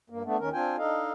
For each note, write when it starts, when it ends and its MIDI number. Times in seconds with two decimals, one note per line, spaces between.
0.10 0.22 43
0.10 0.22 58
0.25 0.37 57
0.25 0.37 59
0.25 0.37 62
0.39 0.49 39
0.39 0.49 51
0.39 0.49 61
0.39 0.49 70
0.53 0.76 60
0.53 0.76 62
0.53 0.76 65
0.53 0.76 79
0.53 0.76 80
0.78 1.13 62
0.78 1.13 63
0.78 1.13 69
0.78 1.13 75
0.78 1.13 77